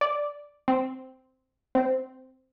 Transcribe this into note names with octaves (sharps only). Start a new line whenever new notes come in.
D5
C4
C4